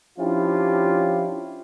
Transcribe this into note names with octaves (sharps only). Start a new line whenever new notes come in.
F3 C#4 D4 E4 F4 G4